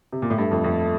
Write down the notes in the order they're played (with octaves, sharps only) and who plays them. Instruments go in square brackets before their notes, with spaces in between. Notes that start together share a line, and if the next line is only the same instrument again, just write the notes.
[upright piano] C3
A#2
A2
[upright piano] G2 [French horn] A3
[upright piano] F2
F2